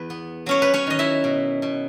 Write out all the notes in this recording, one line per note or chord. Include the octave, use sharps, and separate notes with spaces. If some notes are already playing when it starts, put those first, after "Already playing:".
Already playing: E2 B4
B3
F#3 C#4 C#5
B4
C#4 C#5
D#3 D#5
E4 E5
B2
B2